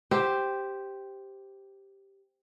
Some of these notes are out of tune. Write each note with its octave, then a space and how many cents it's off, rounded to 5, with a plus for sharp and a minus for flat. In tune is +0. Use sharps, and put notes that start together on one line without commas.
G4 +0 C5 +0 E5 +0